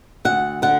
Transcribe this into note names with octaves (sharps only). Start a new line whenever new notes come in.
D2 F#5
D3 F#5